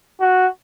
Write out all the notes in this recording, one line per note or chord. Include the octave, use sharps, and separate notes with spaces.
F#4